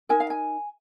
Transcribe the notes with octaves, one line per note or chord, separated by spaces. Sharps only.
D#4 A#4 G#5
F5
G#5